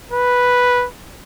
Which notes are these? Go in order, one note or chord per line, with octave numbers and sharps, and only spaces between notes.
B4